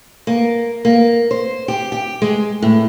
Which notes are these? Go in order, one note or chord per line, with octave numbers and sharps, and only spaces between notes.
A#3
A#3
C5
G4
G4
G#3
A2